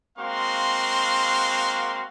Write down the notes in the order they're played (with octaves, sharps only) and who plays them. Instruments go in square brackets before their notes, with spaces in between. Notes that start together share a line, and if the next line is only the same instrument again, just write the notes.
[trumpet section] G#3 A#3 C4 F#4 F5 C6